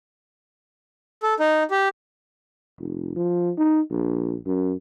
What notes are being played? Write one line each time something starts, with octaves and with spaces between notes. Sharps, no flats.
A4
D#4
G4
F1
F3
D#4
A#1
F#2